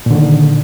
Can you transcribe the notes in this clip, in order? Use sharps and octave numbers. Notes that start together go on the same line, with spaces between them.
A#2 D3 D#3